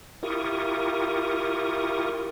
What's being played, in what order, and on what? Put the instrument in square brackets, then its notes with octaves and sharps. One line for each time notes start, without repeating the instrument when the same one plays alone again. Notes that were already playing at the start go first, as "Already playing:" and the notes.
[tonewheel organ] E4 F4 G4 A#4 C#6 D#6